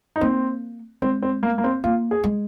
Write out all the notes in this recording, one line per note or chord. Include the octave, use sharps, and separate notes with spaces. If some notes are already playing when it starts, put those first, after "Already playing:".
D#4
A#3 C4
G#3 C4
C4
A#3
A#3
C4
A#3 F4
G#4
G#3